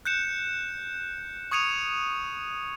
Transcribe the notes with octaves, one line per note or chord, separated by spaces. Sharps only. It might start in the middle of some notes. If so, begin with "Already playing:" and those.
F#6 G6 C#7 E7
C#6 D#6 G#6 C#7 D#7 F7